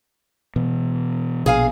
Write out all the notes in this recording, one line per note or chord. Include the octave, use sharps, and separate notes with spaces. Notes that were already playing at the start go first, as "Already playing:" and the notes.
B2 E3
A#1 B2 G#4 F5 G#5